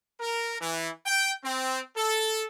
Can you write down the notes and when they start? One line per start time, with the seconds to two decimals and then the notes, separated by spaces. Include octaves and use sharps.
0.20 A#4
0.61 E3
1.06 G5
1.45 C4
1.97 A4